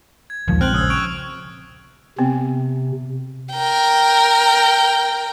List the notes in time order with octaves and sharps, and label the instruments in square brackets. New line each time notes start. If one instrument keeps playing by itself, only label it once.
[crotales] G#6
[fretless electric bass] A#1 F3 G#3 [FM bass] D#2
[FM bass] C4 [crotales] F6 F#6 F#7
[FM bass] C#3 [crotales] D#6 E6 G#6
[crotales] C#6 D7 F7
[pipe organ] C3 [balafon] B3 C4
[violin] A#4 G5